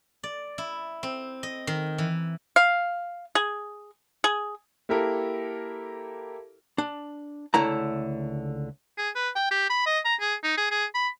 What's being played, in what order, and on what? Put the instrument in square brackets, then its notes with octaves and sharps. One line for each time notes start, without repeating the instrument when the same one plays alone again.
[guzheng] D5
E4
C4
D#5
D#3
E3
[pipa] F5
G#4
G#4
[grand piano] A#3 E4 G4 A4 A#4
[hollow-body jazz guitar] D4
C#2 D3 A3 E4 A#5
[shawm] G#4
B4
G5
G4
B5
D#5
A#5
G#4
D#4
G#4
G#4
B5